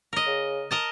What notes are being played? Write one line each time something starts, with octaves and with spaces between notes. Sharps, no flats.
A#4 D#5
C#3
A#4 D#5 A5